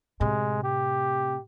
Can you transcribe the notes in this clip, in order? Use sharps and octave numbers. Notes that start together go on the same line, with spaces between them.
A2 C3 G#3
G4